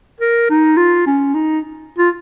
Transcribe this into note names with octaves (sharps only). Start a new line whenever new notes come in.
A#4
D#4
F4
C#4
D#4
F4